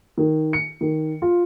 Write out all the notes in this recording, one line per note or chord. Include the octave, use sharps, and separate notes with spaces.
D#3
C#7
D#3
F4